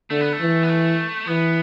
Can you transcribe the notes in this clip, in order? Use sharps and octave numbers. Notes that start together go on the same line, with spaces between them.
D3 A3
B3
A3
E3
B3
A3
E3 B3